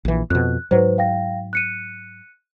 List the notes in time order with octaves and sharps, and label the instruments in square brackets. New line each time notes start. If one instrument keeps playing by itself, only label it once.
[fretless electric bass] A#1 E3
[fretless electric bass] F2 B2 [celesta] F#6
[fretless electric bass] G#2 F#3 [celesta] B4 C5
[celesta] F5 G5 A#6
F#6 C#7 D#7